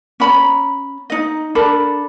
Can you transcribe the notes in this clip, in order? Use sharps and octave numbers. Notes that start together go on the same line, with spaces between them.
C#4 A#5 B5
D#4 D#5
D4 A4 A#4 B5